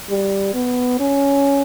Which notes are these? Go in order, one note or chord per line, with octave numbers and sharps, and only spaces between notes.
G3
B3
C#4